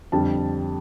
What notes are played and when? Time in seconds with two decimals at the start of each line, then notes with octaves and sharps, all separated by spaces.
0.12 F2 D3 G3 D4 A5